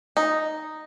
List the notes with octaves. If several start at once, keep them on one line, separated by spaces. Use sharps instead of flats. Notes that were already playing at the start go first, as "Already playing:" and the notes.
D#4